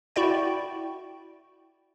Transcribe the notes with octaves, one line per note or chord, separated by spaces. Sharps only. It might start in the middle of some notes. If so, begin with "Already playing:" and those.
E4 F#4 D5 G5